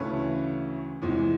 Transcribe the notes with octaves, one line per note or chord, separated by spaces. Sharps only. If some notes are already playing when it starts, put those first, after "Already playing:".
Already playing: D2 C#3 E3 A3 B4 C#5
E2 C3 E3 G#3